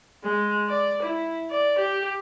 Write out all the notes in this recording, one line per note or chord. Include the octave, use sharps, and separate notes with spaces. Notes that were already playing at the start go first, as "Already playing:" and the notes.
G#3
D5
E4
D5
G4